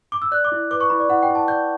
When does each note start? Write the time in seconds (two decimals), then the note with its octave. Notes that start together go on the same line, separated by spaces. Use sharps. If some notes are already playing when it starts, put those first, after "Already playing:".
0.12 D6
0.22 E6
0.32 D5 F#6
0.45 D6
0.52 E4
0.71 B4 D6
0.81 C#6
0.90 E4 B5
1.00 D5
1.09 E4 F#5
1.23 G5
1.29 E4
1.35 A5
1.48 D5 G6